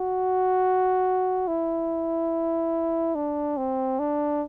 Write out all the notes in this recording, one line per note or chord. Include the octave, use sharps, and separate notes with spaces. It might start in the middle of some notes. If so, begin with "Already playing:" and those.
Already playing: F#4
E4
D4
C4
D4